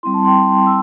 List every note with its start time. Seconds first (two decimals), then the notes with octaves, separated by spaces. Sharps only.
0.03 G3 C4 E4 C6
0.14 A5
0.25 G5 C6
0.66 C6 E6